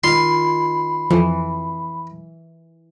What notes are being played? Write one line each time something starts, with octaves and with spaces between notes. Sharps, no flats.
D#3 F4 B5 C6
F2 E3